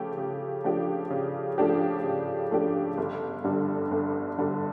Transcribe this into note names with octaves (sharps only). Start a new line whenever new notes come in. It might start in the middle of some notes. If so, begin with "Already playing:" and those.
Already playing: C#3 F3 A3 G4
C#3
F3 A3 D4 G4
C#3
F3 A3 D4 G4
C#3
F3 A3 D4 G4
G1
G2 D3 G3
G1
G2 D3 G3